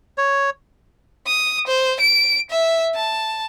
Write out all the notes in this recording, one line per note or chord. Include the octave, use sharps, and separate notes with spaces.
C#5
D#6
C5
D7
E5
A5